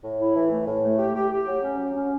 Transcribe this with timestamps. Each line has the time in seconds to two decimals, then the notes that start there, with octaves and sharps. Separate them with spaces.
0.03 A2
0.19 E4
0.35 E3
0.51 A3
0.67 A2
0.83 A3
0.99 G4
1.15 G4
1.31 G4
1.47 F#3
1.63 C#4
1.78 F#3
1.95 C#4